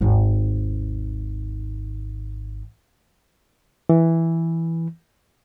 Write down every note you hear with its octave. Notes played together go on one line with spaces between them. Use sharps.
G#1 D#2
E3